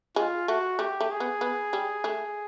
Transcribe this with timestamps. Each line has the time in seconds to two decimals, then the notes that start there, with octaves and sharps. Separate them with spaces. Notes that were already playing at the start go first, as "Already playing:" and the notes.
0.16 G#3 F4
0.48 A3 F#4
0.79 A3 G4
1.01 A3
1.11 G#4
1.20 B3
1.41 B3
1.73 G3
2.04 A3